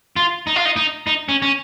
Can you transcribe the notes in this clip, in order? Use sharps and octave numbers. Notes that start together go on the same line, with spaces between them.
F4
D#4
F4
D#4
D#4
D#4
C#4
C#4